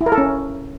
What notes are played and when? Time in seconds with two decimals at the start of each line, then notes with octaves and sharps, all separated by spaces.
0.01 E4
0.06 A#4
0.12 A4
0.18 C#4